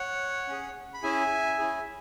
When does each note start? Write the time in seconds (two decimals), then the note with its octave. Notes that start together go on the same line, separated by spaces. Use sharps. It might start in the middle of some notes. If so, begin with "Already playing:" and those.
Already playing: C#5 F#5
0.48 C#4 G#4
0.94 B5
1.03 C#4 E4 G#4 E5 G#5
1.59 C#4 E4 G#4